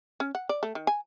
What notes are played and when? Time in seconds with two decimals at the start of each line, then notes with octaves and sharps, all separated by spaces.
0.20 C#4
0.35 F#5
0.49 D5
0.63 A3
0.75 D#3
0.87 G#5